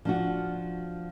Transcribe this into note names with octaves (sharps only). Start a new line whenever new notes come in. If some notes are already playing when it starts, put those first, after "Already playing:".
F3 D4 F#4